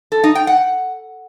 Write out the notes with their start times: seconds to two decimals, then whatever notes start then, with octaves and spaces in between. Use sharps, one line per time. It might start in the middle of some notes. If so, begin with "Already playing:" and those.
0.12 A4
0.24 D#4
0.35 G5
0.47 F#5